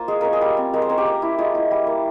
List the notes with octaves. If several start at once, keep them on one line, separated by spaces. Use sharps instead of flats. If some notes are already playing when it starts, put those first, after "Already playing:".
Already playing: A#3 F4 C5
G#3 G#4
C#4 A#4
G#4
G3
C4
G#3 A#4
C5
C#4 A#4
G4
A#3
E4
G#3 F4
E4
G3
A#3